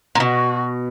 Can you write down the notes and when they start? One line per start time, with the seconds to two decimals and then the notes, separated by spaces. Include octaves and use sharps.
0.15 A#2
0.19 B2 F#4